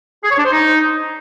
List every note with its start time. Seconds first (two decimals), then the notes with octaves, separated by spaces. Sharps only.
0.24 G#4
0.31 C#5
0.38 D4
0.45 C5
0.52 D#4